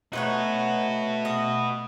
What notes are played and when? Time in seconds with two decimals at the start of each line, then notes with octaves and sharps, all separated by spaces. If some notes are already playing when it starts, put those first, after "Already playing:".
0.13 A3 D#4 F#4 B4 C#5 F#5
1.25 D#5